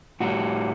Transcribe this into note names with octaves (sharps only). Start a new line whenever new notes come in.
A2 G3 F#4